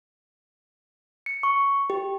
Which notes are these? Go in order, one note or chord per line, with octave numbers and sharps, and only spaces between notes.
C#7
C#6
G4